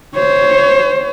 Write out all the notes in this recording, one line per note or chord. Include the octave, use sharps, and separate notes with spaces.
C5 C#5